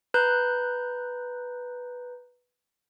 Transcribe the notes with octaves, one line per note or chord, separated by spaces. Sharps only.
B4 A#5 F#6 G6